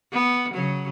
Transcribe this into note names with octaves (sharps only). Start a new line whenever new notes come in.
B3
C#3 F#3